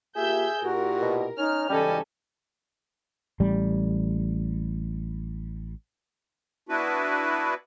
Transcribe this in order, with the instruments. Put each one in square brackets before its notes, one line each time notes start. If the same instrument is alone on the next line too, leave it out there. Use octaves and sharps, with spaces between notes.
[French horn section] A#3 F4 G4 [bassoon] G#4 [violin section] E5 E6 G6
[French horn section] A#2 E4 G4 [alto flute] F#4 [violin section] A#4
[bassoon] B2
[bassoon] C#4 [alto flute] D#4 [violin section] F6
[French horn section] G#2 C#3 E3 [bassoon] G3 [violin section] C#4 A4 G#5 [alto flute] D#5
[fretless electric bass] A1 G3
[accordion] B3 D4 E4 F#4 B4